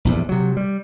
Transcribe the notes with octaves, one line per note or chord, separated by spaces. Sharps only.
A#1 E2 G2
C3 F#3
G3